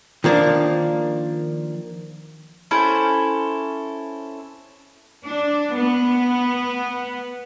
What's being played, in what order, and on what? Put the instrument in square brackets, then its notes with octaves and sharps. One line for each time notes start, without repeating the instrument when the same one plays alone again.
[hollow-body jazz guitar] D#3 F3 A#3 D4
[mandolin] C#4 E4 A4 C5
[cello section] D4
B3